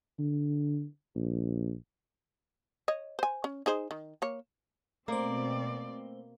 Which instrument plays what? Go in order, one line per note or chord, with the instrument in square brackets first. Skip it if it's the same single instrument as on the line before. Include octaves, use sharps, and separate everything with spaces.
[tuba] D3
A#1
[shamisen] C#5 D#5
C5 G#5
C#4
D#4 G#4 C5
D#3
A#3 C#5
[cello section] B2 C4 [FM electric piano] A3 C5 [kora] A#3 [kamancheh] D5